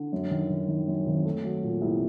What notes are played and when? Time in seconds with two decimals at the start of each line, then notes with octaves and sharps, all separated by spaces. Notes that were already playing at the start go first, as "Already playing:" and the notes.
Already playing: D3
0.13 F#2
0.31 D#3
0.50 D#3
0.68 D#3
0.88 F#2
1.07 G#1
1.25 A3
1.44 F#3
1.63 A#2
1.81 C2